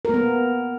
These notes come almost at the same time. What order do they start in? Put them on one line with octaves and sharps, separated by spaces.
A#4 A#3 B3